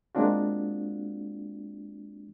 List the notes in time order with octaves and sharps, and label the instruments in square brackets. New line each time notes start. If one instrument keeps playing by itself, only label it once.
[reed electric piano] G#3 A#3 C4 D4 F4 F#4